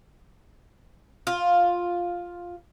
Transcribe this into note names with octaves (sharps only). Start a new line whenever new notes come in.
F4